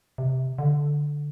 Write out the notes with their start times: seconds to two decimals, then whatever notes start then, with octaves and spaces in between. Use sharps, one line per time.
0.18 C3
0.58 D3